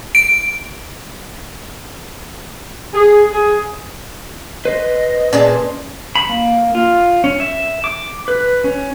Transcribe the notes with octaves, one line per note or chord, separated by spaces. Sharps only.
D7
G#4
G#4
B4 C5 D#5
A#2 C#4 G#4 A5
B5
A#3
F4
C#4
E5
D6
B4
C#4